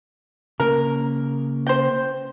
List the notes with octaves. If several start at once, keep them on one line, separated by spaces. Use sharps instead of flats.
C#3 A#3 A#4
C5 G5